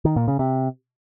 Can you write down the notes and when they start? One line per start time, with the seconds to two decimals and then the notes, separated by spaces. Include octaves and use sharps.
0.05 D#3
0.16 A#2
0.28 C#3
0.39 C3